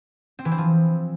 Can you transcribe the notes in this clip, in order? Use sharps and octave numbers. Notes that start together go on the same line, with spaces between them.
C4
E3
C4
F3